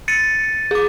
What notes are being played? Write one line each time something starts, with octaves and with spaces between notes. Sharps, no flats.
A6 C#7 D#7
G#4 D6